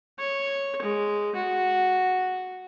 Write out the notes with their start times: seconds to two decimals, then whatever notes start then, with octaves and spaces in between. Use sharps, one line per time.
0.19 C#5
0.82 G#3
1.35 F#4